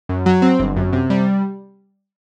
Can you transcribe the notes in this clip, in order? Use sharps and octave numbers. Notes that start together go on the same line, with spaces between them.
F#2
F#3
C4
G1
F#2
C3
G3